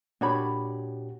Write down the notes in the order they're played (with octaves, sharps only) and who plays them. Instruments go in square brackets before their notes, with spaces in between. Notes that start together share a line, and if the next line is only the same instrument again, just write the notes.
[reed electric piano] A#2 F#4 G4 [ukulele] D4 C#5 B5